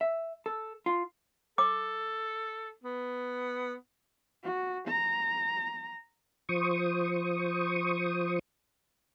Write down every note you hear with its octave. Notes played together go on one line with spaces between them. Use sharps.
E5
A4
F4
A4 D6
B3
F#4
A#5
F3 C5 C#6 D#6